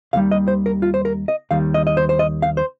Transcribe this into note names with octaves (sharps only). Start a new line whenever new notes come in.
D#2 D#3 G3 F5
D#5
C5
A#4
F4
C5
A#4
D#5
D#2 D#3 G3 F5
D#5
D#5
C5
C5
D#5
F5
C5